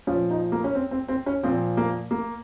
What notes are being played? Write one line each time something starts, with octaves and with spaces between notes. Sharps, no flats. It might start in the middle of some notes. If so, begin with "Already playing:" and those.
A#2 F3 C#4
D#4
A#3
C#4
C4
C4
C4
C#4
A#2 F3 C4
A#3
A#3